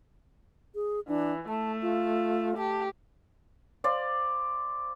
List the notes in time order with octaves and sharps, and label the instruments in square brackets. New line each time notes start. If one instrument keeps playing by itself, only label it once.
[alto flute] G#4
[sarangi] E3 [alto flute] D4
[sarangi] A3 [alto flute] A5
[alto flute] F4
[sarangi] G4 [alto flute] A5
[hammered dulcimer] C5 D5 F5